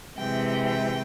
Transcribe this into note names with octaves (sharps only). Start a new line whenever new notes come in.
C3 E3 G#3 G5
G5